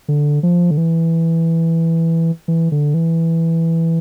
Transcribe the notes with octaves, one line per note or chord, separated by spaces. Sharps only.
D3
F3
D3
E3
E3
D3
E3